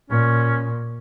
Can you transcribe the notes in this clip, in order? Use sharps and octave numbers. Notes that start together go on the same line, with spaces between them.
A#2 C#4